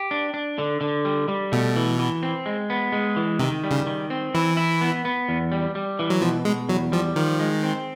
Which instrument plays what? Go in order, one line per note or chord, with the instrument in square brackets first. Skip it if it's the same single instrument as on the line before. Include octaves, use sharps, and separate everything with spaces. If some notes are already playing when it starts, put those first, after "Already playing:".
Already playing: [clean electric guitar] G4
D4
D4
D3
D3
G3
G3
[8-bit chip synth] B2 [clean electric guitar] A3
[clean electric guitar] E3
E3
C4
G#3
B3
G#3
E3
[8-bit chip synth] C3 [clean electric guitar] D#3
[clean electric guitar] G3
[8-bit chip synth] C#3
[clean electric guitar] D#3
C4
[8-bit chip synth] E3 [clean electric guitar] E4
[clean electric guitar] E4
B3
B3
E2
G3
G3
E3
[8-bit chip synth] F#3
[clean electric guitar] B2 [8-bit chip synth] F3
[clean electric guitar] B2 [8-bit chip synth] G#3
[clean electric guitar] E2 [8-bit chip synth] F#3
[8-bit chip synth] F3 [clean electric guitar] G3
[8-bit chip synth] D#3 [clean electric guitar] F3
[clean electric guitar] G#3
C4